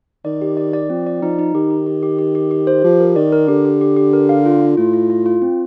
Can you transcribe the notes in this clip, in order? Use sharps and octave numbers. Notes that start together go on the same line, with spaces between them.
D#3 D5
G4
D5
D5
F3 C4
D5
F3 D#4
D#4
D#3 G4
G4
G4
G4
G4
G4
G4
C5
F3 G4
A#4
D#3 D5
A#4
D3 G4
G4
G4
G4
A#4
F5
F4
F4
A2 F4
F4
F4
F4
C4